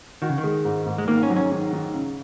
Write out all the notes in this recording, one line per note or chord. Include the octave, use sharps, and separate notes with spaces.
D#3 F#4
C#3
D#3
G#3
G#2
G#2
G#3
D#3 A#3
C#4
F#3
C#4
D#3
D#3
C#3